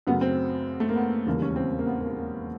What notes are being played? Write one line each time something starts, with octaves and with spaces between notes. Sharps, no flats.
F#2 C#3 F#3 A3 B3
C4
A3
A#3
B3
E1 D#2 C#3 E3 G3 A#3
C#4
C4
A#3
B3
A#3
A#3